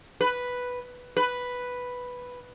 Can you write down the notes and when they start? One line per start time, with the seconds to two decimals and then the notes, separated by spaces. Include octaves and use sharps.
0.21 B4
1.17 B4